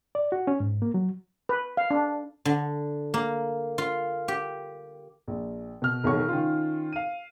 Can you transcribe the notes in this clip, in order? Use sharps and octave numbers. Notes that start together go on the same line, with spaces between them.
D5
F#4
C#4
G#2
A#3
F#3
B4
F5
D4
D3
A#3
F4
G4
A#1
B2 F6
E1 B1 B2 D#3 C#5 C#6
D#3 C#4 F4
F5 D#7